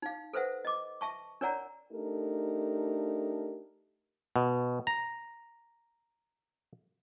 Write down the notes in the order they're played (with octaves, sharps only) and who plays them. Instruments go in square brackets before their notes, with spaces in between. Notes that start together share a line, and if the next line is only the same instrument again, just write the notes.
[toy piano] D#4 F5
A4 B4 C5 E5 F#5
D#5 D6
E5 A5 C#6
D4 A#4 C#5 D5 F#5 A#5
[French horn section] A3 D4 D#4 G4 A4 A#4
[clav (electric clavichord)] B2
A#5